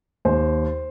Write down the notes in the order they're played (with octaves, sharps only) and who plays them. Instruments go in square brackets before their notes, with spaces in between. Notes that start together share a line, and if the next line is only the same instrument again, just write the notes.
[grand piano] D#2 C5